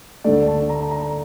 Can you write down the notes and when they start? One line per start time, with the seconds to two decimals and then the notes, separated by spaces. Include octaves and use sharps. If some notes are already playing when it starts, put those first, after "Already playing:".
0.24 D2 D3 A3 D5
0.47 A5
0.69 A#5
0.91 A#5